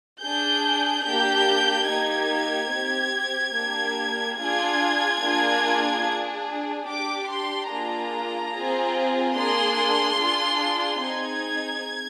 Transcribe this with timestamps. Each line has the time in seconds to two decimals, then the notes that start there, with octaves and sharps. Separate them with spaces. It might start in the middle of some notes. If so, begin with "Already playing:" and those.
0.22 D4 G#4 G6
1.05 A#3 D4 G4 G6
1.88 A#3 D#4 G4 G#6
2.71 C4 G4
3.55 A#3 D4 G4
4.38 D4 F4 G#4 G#6
5.21 A#3 D4 F4 G#4
6.04 D4 G#4
6.87 D4 G4 D6
7.29 C6
7.70 A#3 D4 F4 G#4 A#5
8.54 C4 F4 G#4
9.36 A#3 D4 G#4 C6
10.19 D4 F4 G#4
11.03 C4 D#4 G#4 G#6